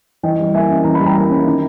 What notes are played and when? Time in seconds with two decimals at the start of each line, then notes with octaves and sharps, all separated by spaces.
0.23 E3 D#5 G5
0.39 G3
0.54 A#3 E5 G#5
0.69 C#4
0.84 E3 A#5
0.95 G3 B5
1.06 G5 A#5
1.15 A#3
1.30 C#4
1.46 D#3